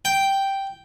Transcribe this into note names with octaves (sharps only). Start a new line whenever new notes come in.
G5